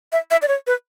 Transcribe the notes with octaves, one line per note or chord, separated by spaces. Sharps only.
E5
E5
D5
C#5
B4